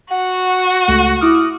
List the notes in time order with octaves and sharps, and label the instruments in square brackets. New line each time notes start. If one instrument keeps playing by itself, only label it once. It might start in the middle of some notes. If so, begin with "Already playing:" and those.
[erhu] F#4 [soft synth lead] F#5
[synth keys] C#2 A3
[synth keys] E4 D6 F6 [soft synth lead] D#6